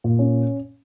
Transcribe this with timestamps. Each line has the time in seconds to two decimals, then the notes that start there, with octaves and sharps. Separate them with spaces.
0.04 A#2
0.19 C#4